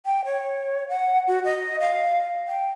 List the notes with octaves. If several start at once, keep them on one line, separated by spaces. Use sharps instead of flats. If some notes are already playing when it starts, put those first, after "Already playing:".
G5
C#5
F#5
F#4
D#5
F5
G5